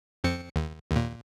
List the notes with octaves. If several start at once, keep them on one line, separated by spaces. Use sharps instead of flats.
F2 C4 C#7
D#2
D#2 A#2